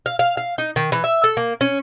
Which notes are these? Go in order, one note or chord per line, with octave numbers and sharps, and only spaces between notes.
F5
F5
F5
D#4
D#3
E3
E5
A4
A#3
C#4